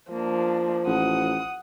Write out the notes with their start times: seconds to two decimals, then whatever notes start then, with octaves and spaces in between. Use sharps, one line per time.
0.12 F3 A#3 D4
0.87 A1 F#5 D#6